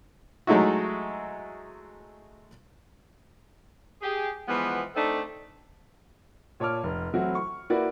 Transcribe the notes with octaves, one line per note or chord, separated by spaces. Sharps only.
F#3 G#3 A3 D#4 E4 F#4
G4 G#4
E3 F3 G#3 B3
A3 C4 D4 D#4 A4
A#2 C#5 A5 D6 F6
F1
E3 F#3 A3 C4 E4 F#4
C#6
A#3 E4 F#4 A#4 B4 D5